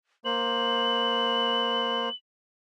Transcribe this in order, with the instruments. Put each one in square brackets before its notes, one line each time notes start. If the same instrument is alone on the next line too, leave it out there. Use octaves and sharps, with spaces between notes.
[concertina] A#3 C5 [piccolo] F#7